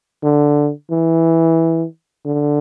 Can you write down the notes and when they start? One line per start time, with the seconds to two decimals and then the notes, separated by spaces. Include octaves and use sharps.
0.23 D3
0.91 E3
2.25 D3